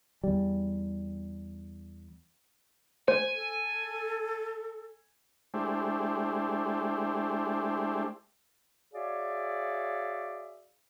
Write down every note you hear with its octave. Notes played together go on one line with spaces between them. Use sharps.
E2 G3
C5 G#5
A4
G#3 A3 D4 E4 G4 C5
F#4 G#4 C#5 D5 E5 F5